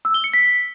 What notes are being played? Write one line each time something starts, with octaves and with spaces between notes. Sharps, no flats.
E6
G7
C#7
B6